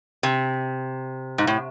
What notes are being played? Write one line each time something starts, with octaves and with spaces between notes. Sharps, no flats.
C3
G#2
A2